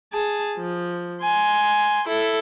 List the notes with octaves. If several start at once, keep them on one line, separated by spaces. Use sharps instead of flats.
G#4 A5
F3
G#5 C6
E4 A4